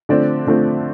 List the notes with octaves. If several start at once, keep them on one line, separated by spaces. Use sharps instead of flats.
D3 F3 A3 C4 D5
D3 F3 A3 C4